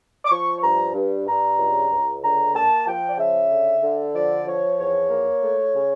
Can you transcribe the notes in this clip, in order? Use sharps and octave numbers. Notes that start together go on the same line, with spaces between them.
D6
F3 C#6
C#6
G2 A#5
G2
G2 A#5
C#2
C#2
D3 A#5
A#3 A5
F3 G5
D5
C#3 E5
D3
D3
F3 D5
F3 C#5
E2 C#5
A#3
A3
C#3